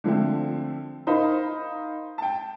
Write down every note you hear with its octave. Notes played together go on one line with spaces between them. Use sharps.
D3 F3 A3 C4
D#4 A#4 C5 F5 B5
G5 A5